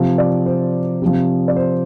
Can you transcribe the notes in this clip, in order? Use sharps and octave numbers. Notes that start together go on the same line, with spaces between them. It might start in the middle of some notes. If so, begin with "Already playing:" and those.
Already playing: C3 F3
D5
C5
C3 F3
D5
C5